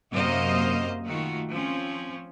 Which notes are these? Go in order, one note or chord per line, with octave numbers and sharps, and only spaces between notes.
F#2 C3 A#3 C5 D#5 F5
D#3 A3 F4 F#4
F3 C4 C#4